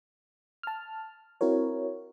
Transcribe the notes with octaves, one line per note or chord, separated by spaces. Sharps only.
A5 F6
C4 E4 F#4 A#4 C#5